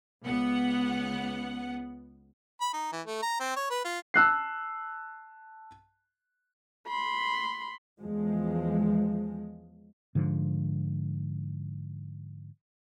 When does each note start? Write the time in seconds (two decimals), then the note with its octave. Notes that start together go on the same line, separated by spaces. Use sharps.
0.23 C#2 B3 F#5
2.61 B5
2.73 D#4
2.92 E3
3.06 A3
3.22 A#5
3.40 C4
3.56 C#5
3.70 B4
3.85 F4
4.14 A5 E6 F#6 C7
6.88 B5 C6
8.00 E2 F3 G#3
10.15 G#2 D3 F3